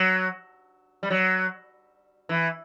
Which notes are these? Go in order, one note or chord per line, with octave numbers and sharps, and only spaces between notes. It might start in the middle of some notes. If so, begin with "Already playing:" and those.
Already playing: F#3
G3
F#3
E3